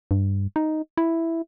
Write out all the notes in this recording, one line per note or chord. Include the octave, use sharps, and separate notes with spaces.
G2
D#4
E4